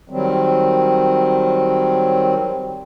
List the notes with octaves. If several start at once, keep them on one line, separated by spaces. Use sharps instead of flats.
D#3 F#3 G3 C4